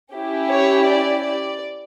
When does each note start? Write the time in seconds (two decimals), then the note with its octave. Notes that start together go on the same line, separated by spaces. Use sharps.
0.13 C#4 E4 G4
0.49 C#5
0.87 D5
1.24 D5